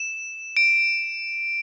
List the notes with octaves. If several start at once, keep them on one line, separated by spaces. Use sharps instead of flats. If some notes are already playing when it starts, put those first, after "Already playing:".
Already playing: E7
D7